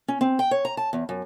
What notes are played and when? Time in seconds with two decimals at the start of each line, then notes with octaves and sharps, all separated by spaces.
0.08 C#4
0.21 C4
0.39 G5
0.51 C#5
0.65 A#5
0.77 A5
0.93 E2
1.09 F#2